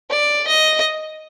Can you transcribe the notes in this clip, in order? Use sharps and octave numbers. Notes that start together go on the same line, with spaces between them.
D5
D#5